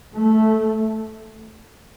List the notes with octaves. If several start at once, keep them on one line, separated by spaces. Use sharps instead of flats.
A3